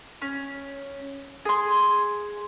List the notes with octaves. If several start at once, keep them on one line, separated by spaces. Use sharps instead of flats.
C#4
G#4 C6